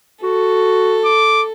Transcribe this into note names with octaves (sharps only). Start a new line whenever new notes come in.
F#4 A4
D6